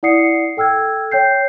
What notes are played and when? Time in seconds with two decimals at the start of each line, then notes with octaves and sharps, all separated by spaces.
0.03 E4 D5 F#5 D#6 C7 C#7
0.57 A4 G5 E6 F6 G#6
1.11 C#5 G5 G6 C7